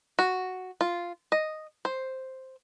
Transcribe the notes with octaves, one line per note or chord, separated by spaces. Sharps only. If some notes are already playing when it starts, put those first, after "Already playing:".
F#4
F4
D#5
C5